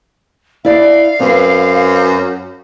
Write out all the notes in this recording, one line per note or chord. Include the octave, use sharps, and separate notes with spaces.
E4 D5 F5
F#2 C4 B4